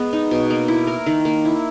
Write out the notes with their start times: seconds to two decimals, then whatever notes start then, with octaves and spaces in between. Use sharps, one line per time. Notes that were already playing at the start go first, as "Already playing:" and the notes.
Already playing: G#3 B3
0.13 D#4
0.31 B2
0.50 A#3
0.68 E4
0.87 A#4
1.06 D#3
1.25 A#3
1.45 E4